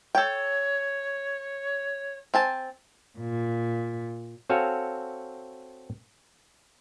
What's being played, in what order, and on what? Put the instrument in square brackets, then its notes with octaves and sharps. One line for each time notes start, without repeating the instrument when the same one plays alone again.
[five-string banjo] A4 G5 [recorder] C#5
[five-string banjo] C4 G#5 A5
[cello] A#2
[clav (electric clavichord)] C4 F#4 A4 C#5 F5 G#5